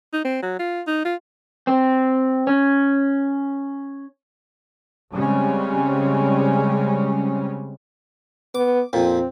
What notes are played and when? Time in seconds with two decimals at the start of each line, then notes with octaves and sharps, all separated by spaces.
0.13 D#4
0.25 C4
0.42 F#3
0.59 F4
0.87 D#4
1.05 F4
1.67 C4
2.47 C#4
5.13 C#3 G3 G#3 C4 C#4
8.55 B3 D6
8.93 F2 A#2 C4